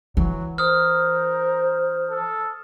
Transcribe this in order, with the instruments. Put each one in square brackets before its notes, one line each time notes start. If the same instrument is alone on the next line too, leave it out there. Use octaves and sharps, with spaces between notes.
[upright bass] E3 [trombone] F#3
[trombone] A#4 [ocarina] C5 [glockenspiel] D#6 F6
[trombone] A4